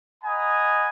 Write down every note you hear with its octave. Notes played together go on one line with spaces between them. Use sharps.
D#5 F#5 G#5 A#5 B5 D#6